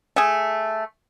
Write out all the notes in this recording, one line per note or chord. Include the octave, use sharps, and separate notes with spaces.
A3 G#4